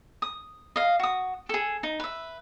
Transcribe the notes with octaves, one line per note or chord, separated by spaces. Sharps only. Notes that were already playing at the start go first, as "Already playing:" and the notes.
D#6
D#5 F5
F#4 D#6
G#4 A4
D#4
B4 E5